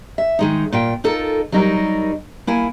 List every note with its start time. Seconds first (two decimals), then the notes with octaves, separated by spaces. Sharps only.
0.18 E5
0.39 D#3 G#3 D#4
0.72 A#2 F4 G5
1.04 D#4 F4 A4 A#4
1.52 F#3 G3 D#4 A#4
2.47 A#3 E4 G#5